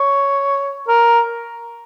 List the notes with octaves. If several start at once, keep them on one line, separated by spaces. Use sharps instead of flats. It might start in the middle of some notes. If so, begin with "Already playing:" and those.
Already playing: C#5
A#4